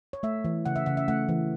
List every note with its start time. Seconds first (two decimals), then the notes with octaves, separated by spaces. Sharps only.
0.13 C#5
0.23 A3 E5
0.44 E3
0.66 C#3 F#5
0.76 E5
0.86 C#3 F#5
0.97 E5
1.08 A3 F#5
1.29 E3